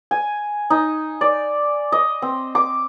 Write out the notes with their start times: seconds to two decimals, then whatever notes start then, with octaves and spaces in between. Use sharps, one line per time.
0.11 G#5
0.70 D#4
1.21 D5
1.92 D#5
2.22 C4
2.55 D6